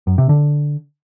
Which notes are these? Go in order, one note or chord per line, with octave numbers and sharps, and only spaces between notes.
F#2
C3
D3